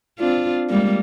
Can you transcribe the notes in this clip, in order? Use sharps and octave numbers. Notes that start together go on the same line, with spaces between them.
C4 D4 F4
G3 G#3 A#3